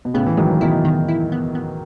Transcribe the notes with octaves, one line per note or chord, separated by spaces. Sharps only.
B2
A2 C#3 B3
E3
D#3 F#3 G#3
E3
B2 D#3 E4
B2 D#3
E4
B3
B3